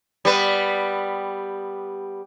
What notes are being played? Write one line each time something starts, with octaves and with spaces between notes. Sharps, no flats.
G3 B3 B4